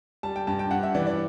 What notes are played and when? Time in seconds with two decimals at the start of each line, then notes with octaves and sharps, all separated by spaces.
0.23 G3 A5
0.36 G5
0.47 G2 A5
0.59 G5
0.71 G2 F#5
0.83 E5
0.95 E3 D5
1.07 D5